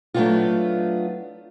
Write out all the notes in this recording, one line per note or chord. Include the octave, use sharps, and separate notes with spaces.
F#3 A3 B3 C4 D4 F4